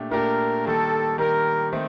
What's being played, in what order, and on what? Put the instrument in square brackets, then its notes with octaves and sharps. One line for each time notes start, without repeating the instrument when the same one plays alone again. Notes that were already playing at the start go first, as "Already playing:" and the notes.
Already playing: [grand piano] A#2 A3 D4 G4
[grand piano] A#2 A3 D4 G4 [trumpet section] A#4
[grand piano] D#3 G3 A#3 [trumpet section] A4
[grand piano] D#3 G3 A#3 [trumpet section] A#4
[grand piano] D#3 A3 C4